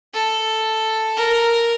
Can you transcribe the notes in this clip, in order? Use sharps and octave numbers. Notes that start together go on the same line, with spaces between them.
A4
A#4